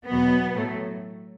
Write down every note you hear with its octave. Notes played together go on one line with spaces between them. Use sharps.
E2 B2 F#3 B3
A2 F#3 A3